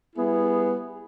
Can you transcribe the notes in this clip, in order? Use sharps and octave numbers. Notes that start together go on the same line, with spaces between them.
G3 B3 E4 G#4